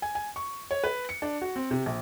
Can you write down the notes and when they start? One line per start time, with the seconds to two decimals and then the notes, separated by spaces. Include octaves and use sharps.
0.02 G#5
0.15 G#5
0.36 C#6
0.71 C#5
0.84 B4
1.09 C#7
1.22 D4
1.41 F#4
1.56 C4
1.71 C3
1.86 A#1